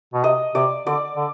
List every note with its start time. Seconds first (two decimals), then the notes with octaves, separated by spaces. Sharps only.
0.14 B2
0.24 C3 D#5
0.55 C3 D5
0.87 D3 D5
1.17 D3